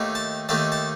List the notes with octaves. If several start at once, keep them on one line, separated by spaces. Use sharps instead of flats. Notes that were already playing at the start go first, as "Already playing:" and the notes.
Already playing: D#2 D#3 A3 D#4
A5
D#2 D#3 A3 D#4 A5
A5